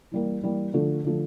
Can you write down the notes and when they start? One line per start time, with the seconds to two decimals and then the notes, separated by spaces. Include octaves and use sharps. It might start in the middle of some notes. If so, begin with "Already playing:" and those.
0.11 E3 G3 A#3
0.42 E3 G3 A#3
0.74 D3 F3 A3
1.05 D3 F3 A3